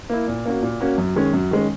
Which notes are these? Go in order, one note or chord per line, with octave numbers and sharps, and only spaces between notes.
A#3 E4
A#2
A#3 C#4 F#4
A#2
A#3 C#4 F#4
F#2
D#3 G#3 C#4
F#2
D#3 G#3 C#4